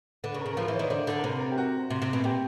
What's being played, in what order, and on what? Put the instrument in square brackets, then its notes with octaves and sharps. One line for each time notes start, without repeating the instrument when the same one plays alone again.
[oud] D3 [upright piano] B4
[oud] C#3
[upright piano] A#4
[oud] C#3
[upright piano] A#4
[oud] F3 [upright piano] B4
[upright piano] C5
[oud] E3
[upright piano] C#5
[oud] D#3 [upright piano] D5
[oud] D3 [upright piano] C5
[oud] D3
[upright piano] A#4
[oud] C3 [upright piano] B4
[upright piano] A#4
G4
F#4
[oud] C3
C3
B2
[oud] A#2 [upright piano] G4